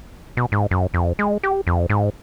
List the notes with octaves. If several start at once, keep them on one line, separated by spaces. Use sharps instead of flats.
B2
G#2
F#2
F2
G#3
G4
F2
G#2